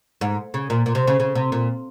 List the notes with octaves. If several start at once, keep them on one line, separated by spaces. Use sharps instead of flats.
G#2
C#3
A#2
A#2
C3
C#3
C#3
C3
A#2